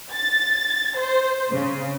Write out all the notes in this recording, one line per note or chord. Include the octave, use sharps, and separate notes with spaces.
A6
C5
C#3